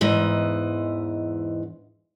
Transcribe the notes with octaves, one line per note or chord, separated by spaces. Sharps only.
E2 G#2 E3 D#5